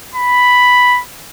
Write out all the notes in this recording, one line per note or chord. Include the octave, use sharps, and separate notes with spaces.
B5